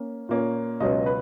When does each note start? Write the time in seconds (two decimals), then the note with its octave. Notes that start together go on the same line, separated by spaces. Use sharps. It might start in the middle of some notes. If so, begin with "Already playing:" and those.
Already playing: A#3 C#4
0.29 A#2 A#3 C#4
0.80 C#2 B2 F#3 C#4 D#5
1.06 B4